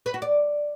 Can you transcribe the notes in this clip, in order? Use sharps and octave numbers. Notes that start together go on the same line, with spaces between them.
B4
F#4
D5